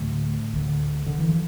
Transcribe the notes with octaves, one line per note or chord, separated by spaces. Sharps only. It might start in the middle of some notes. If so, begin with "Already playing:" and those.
Already playing: D2 A2 D3 A3
D2 D3
D3
E3
F3